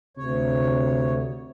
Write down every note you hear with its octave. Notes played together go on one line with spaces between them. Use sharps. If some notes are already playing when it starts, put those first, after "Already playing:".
D2 C3 C#5